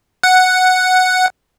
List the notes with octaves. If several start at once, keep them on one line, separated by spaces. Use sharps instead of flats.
F#5